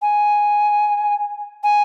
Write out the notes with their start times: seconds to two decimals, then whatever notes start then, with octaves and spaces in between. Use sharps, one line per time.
0.02 G#5
1.64 G#5